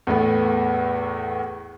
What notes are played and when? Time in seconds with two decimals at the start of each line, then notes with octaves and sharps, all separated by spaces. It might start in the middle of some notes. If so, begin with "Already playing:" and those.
0.07 E2 A2 A3 B3